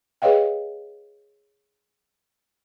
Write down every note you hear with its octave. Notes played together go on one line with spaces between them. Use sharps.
G#4 B4 C#5 D#5 F5 G5